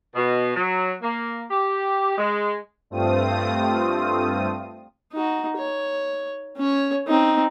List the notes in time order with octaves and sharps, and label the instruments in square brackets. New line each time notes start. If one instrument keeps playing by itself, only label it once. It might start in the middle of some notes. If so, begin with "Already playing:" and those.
[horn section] B2
F#3
A#3
G4
G#3
[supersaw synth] G2 A3 C4 F4 D#6
[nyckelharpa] D#4 F#4
C#5
C#4 C#5
C4 D#4